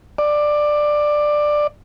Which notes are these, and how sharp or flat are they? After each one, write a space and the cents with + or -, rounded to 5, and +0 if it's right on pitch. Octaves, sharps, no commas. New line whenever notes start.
D5 +10